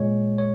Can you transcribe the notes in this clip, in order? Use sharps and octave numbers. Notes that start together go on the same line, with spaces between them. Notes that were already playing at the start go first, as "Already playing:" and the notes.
Already playing: A#2 G#3 C#5
C#5